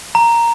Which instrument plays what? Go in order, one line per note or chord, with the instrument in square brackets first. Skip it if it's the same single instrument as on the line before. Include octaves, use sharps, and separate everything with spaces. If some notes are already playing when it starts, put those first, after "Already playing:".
[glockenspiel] A#5